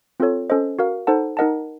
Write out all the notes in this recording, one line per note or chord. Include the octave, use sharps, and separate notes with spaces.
C4 F4 A4 C#5
C#4 A4 C5 D#5
F#4 A#4 F5
D#4 A4 C5 F#5 A5
D#4 A#4 D#5 F#5 A5